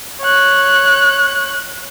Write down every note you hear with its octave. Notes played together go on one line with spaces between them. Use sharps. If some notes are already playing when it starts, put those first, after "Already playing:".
C#5 F#6